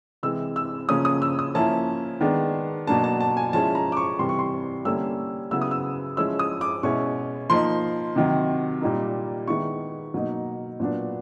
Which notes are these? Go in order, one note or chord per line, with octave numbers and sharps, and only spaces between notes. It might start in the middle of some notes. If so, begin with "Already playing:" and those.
C3 E3 G#3 E6
E6
C#3 F3 A#3 C#4 D#6
D#6
E6
D#6
F3 A#3 C#4 E4 A5
D#3 G#3 B3 D4
B2 F#3 A#3 D4 A5
A5
A5
G#5
F3 G#3 C#4 E4 A5
A#5
D6
C#6
C3 E3 G3 C6
C#6
C6
D3 G3 A#3 C#4 E4 E6
C#3 F#3 B3 E4 E6
D#6
E6
F3 G#3 C#4 E4 E6
D#6
D6
B2 G#3 C#4 E4 C#6
F3 A#3 D#4 C6
C3 D#3 F#3
A#2 G3 A#3 D#4
D#3 G#3 B3 E4 C#6
B2 F#3 A#3 D#4
A#2 F#3 B3 D4